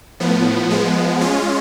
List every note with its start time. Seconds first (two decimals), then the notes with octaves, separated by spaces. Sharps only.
0.20 A2 F3 B3
0.70 F3 G#3 B3
1.21 G#3 C#4 F4